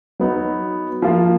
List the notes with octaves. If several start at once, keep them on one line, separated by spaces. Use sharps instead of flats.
F#3 B3 D#4
F3 A#3 F4